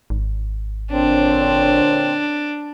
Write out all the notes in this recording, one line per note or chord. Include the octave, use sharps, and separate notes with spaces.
G#1
A#2 D3 C4 D4 C#5